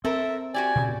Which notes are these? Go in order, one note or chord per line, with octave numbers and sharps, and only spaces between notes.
C4 A4 A#4 E5
F#4 G4 D5 G#5
A#2 C#3